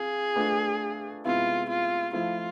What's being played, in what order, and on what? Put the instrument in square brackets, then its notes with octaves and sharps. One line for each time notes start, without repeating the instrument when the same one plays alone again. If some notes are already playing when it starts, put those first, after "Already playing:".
Already playing: [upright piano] C4 F4 [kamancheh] G#4
[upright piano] A3 D4 F4 B4
[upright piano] C3 G#3 B3 E4 [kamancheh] F4
[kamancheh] F4
[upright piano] F3 A3 E4 A4 C5 [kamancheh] F4